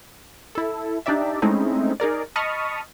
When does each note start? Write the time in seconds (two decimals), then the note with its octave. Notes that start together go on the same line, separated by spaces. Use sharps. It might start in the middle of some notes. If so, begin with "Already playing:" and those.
0.55 E4 A4
1.06 D4 D#4 G4 D5 E5
1.42 G#3 A3 C4 C#4 D#4 E4
2.00 D#4 G#4 A#4 D5
2.36 D#5 A5 B5 C#6 D#6 F6